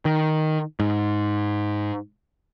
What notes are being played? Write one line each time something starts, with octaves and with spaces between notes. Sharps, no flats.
D#3
G#2